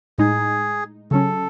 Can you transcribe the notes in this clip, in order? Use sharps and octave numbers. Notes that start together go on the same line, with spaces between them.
A2 G#3 D#4 G#4
C#3 F#3 C#4 A4